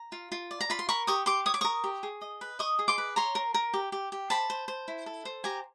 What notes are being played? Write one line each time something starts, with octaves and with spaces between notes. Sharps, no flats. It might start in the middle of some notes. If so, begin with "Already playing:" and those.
Already playing: A#5
F4
F4
D5
A#5
F4 B5
C6
A#4 B5 C#6
G4 C#6 D#6
G4 C6 D6
C#5 D#6
D6
A#4 C#6 D#6
G4
G#4
D#5
B4
D#5 C#6 D#6
G#4
C6 D6
B4
C#5 A#5 C6
A#4
A#4
G4
G4
G4
C5 A5 B5
C5
C5
E4
A4
C5
G4 G#5 A#5